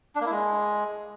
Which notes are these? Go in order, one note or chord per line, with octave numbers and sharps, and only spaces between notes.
D4
A#3
E4
G#3